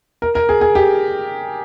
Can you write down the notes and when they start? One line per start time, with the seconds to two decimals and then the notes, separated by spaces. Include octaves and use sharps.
0.22 A#4
0.35 A#4
0.49 G#4
0.61 G#4
0.75 G4